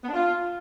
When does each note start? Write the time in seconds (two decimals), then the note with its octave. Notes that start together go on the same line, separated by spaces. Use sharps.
0.03 B3
0.08 D4
0.14 F4